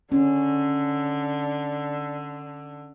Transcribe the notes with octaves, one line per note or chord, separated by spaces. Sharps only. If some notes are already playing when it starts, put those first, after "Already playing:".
D3 C#4